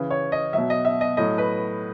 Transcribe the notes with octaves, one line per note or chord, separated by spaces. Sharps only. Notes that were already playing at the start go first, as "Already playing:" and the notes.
Already playing: C#3 E3
C#5
D#5
B2 F#3 E5
D#5
E5
D#5
A2 F#3 D#5
B4